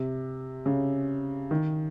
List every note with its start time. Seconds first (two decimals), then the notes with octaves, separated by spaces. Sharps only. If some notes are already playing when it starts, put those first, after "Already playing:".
Already playing: C3
0.66 C#3
1.51 D#3